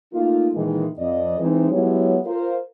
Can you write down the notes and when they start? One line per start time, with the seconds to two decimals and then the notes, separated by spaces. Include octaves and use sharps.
0.13 A3 A#3 D#4 F4
0.53 A#2 D#3 E3 G#3
0.99 F2 D5 D#5
1.40 E3 G#3 C4 D#4 E4
1.71 F#3 G#3 B3 E4 G4 C#5
2.25 F4 A#4 C5